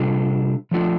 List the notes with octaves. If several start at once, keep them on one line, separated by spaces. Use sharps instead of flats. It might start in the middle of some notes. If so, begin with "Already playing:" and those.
Already playing: C3 G3 D4 F4 A4
F3 A3 D4 F4 A4